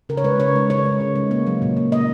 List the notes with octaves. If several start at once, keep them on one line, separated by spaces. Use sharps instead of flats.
C#3 A#4
C#5
G#3 B4
C#3 C#5
G#3
C#3 C#5
G#3
C#3
G#3
A#3
F#3
A#2
A#2
A#3 D#5